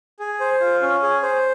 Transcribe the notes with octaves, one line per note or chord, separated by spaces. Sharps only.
G#4
C5
F4
C#4
G#4
C5